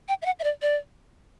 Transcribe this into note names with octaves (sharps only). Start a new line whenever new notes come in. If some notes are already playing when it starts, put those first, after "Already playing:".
G5
E5
F#5
E5
D5
D5